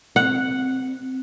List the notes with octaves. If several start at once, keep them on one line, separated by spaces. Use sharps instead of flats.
C4 F#5